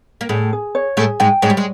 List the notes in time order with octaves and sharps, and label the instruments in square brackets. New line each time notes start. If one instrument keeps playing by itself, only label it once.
[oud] A#3
[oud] A2 A3 [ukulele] G#4
[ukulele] G#4
C#5
[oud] A2 A3 [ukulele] G#4
[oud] G#2 G#3 [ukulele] G5
[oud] G#2 G#3 [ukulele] C#5
[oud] G3
G#3